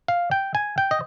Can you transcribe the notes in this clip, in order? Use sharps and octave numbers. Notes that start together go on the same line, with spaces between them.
F5
G5
G#5
G5
D#5